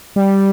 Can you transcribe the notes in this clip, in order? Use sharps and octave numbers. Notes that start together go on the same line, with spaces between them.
G3